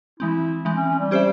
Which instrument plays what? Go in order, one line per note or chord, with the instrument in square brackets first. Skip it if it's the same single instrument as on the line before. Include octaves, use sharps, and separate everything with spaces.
[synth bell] E3 G#3 C4 [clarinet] E4
[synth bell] E3 G#3 C4
[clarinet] C#4
C#4
G3
[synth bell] C#4 G4 C5 E5